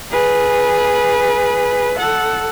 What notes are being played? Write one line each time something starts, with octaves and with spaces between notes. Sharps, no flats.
G#4 B4
A4 F#5